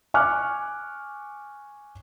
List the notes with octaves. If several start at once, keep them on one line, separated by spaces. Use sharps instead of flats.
G#5 C#6 D6 F6 F#6